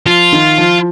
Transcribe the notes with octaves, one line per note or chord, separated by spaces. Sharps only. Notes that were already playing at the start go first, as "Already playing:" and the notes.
F3 F4
D#3
F3